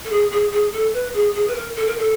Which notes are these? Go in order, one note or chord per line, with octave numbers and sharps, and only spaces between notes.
A4
G#4
G#4
G#4
A4
B4
G#4
G#4
B4
A#4
A4
A#4
A4